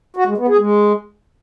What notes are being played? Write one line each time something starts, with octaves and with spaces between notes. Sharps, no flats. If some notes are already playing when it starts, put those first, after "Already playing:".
F#4
G#3
B3
G#4
G#3